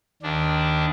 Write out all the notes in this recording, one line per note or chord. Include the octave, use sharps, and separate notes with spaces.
D#2 D4